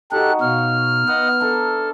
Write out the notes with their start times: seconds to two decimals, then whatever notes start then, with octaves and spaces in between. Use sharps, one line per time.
0.12 D#4 F#4 G4 A4 F#6
0.41 B2 C#5 D#5 F5 F6
1.08 B3 D#5 F#5
1.41 D4 A4 E5 A#5